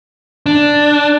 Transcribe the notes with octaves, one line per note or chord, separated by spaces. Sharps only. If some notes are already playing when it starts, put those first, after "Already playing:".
D4